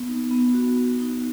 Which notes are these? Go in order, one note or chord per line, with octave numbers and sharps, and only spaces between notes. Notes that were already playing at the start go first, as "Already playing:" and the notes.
Already playing: B3
D#4
B3
F#4
B3
D#4